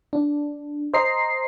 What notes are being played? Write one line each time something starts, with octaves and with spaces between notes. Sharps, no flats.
D4
C5 D#5 A#5 C7